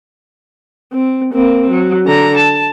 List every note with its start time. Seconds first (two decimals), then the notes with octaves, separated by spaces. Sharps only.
0.93 C4
1.33 A#3 C4
1.70 F#3
2.06 D3 A#5
2.38 A5